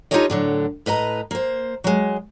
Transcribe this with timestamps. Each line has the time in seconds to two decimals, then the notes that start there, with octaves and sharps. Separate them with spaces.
0.11 D#4 F4 G4 A4 C#5 D#5
0.30 A2 D3 F#3
0.86 A2 B4 D#5 A#5
1.31 A#3 C5
1.84 F#3 G#3